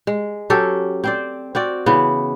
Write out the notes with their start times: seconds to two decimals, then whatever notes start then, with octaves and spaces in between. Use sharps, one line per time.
0.07 G#3
0.50 F#3 C#4 G4 A4
1.04 C4 C5 D5
1.55 C4 F#4 D5
1.86 C#3 E3 B3